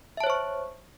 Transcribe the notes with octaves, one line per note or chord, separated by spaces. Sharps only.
C5 C#5 E5 A5 C#6